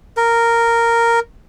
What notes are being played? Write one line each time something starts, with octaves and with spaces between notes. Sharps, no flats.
A#4